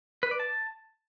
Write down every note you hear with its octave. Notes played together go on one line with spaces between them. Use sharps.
B4
D5
A5